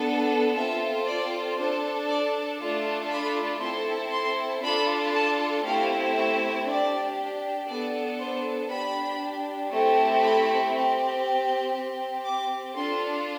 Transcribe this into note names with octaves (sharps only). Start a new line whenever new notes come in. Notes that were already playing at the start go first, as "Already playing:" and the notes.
Already playing: B3 D4 A4
C4 F4 A4 E5
D5
D4 A4 C5
D5
A3 D4 F4 A4
B5
C4 E4 A4 C6
C6
D4 F4 A4 B5
A5
A3 C4 E4 G4 F5
E5
D4 G4 D5
B3 D4 A4 D5
C5
D4 G4 B5
A3 C4 E4 G4
B5
C4 G4
C4 G4
D6
D4 F4 A4 C6